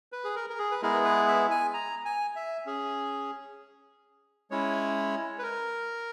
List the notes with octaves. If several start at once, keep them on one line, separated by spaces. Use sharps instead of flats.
B4
G#4
A#4
A#4
G#4
B4
G#3 B3 E4 G#4 A#4
B4
E5
G#5
A#5
G#5
E5
C#4 G#4
G#3 C#4 E4 C#5
B4
A#4